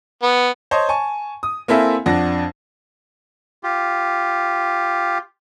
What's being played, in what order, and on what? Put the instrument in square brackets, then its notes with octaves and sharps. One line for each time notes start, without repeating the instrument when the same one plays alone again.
[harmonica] B3
[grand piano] C5 C#5 D#5 A5 C6
G#5 A5 C#6
D#6
A#3 C4 E4 A4 E5 G#5
F2 D4 F#5 A#6
[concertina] F4 G4